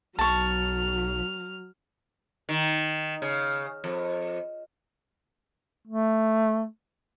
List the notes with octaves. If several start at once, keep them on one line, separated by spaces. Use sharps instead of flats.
B1 F#3 A5 C#6 F6 F7
D#3
C#3
F2
A3